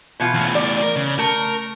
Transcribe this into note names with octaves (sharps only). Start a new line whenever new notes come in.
B2 E3 F4
E2 A2
D5
A#4
C#3
A3 A#4